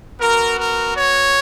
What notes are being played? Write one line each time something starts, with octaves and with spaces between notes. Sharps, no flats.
B3 F#4 A#4
A#4
C#5